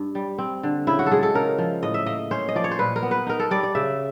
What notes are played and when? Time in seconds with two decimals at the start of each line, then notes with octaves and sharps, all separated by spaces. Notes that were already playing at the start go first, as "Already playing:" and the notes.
Already playing: G2
0.15 G3
0.38 C4
0.63 D3
0.87 C#3 E4
0.99 F#4
1.06 A4
1.11 G#3 G#4
1.23 A4
1.35 C#3 A#4
1.58 F3
1.83 A2 D#5
1.94 E5
2.06 A#3 D#5
2.31 C#4 C5
2.49 D#5
2.55 F3 D5
2.64 C#5
2.71 C5
2.79 A#2 B4
2.96 A#4
3.03 B3
3.11 B4
3.27 D#4 A#4
3.39 A4
3.51 G3 D5
3.63 D5
3.75 C#3 E5